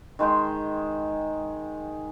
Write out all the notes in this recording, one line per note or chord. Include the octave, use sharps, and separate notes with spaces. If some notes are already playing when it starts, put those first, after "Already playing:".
D#3 G#3 C5 G5